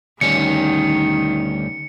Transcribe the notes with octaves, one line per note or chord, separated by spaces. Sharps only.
D2 D#3 G3 C#4 C#7